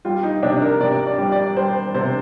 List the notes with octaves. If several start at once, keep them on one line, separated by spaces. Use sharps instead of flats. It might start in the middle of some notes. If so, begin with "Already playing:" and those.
G3 F4
D#4
C3 D4
A#4
C3 D5
D5
G3
D5
G3 C5
C3 C5